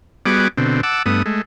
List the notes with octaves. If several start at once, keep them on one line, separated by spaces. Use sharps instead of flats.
G3 B3 F#4 G#4 D6
B2 D3 C4
F#5 A5 D6 E6
G2 A3 B3 D#6
G#3 A3